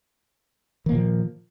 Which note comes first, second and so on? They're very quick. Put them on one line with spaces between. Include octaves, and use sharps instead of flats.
D#3 A#3 A#2 F3